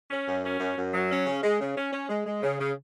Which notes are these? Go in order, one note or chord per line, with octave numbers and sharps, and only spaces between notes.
C#4
F#2
C#4
F#2
F#2
F#3
C#4
C#3
G#3
C#3
C#4
C#4
G#3
G#3
C#3
C#3